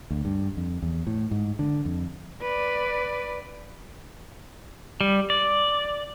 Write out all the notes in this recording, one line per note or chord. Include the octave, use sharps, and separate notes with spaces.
D2
G2
F2
E2
A2
G#2
D3
F2
B4 D5
G3
D5